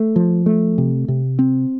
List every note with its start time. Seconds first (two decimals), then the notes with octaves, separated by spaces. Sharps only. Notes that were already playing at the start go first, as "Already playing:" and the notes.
Already playing: A3
0.16 F3
0.46 A3
0.78 C3
1.08 C3
1.39 C4